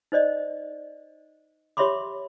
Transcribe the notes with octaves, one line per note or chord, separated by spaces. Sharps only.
D#4 C5 D5 D#5
G4 C#5 E5 B5 C6 D6